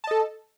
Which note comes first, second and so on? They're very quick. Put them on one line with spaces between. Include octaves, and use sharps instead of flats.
A5 D#5 A4